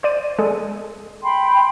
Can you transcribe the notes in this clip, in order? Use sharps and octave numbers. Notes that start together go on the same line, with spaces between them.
C5 D5 D#7
G#3 A4
G5 B5 C6